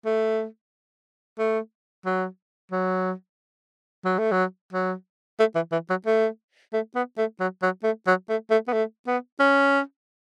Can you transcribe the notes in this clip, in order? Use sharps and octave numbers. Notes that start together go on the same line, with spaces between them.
A3
A3
F#3
F#3
F#3
A3
F#3
F#3
A3
E3
E3
F#3
A3
A3
B3
A3
F#3
F#3
A3
F#3
A3
A3
B3
A3
B3
C#4